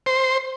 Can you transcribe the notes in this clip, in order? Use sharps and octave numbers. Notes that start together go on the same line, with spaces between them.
C5